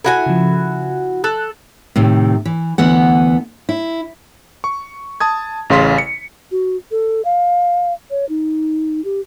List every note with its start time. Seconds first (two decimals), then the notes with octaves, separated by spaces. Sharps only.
0.04 E4 F#4 A4 G#5
0.26 C#3 F3
1.24 A4 F#6
1.96 A2 C3 D#3
2.45 E3
2.78 D2 E3 B3 F#5
3.69 E4
4.64 C#6
5.20 A5 D#6 G#6
5.70 A1 C#3 F5 C6 B6
5.98 C#7
6.51 F#4
6.91 A4
7.25 F5
8.10 C#5
8.29 D#4
9.05 G4